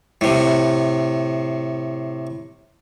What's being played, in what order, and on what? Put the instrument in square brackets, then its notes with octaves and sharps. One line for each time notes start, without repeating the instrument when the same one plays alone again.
[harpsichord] A2 C3